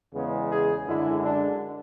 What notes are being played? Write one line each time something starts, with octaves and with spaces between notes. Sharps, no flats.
E2 C#3 G#3 B3
G#4
F#2 D3 G#3 E4
D4